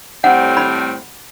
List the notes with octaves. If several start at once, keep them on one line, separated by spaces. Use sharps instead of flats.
A2 G3 C4 F#5
B5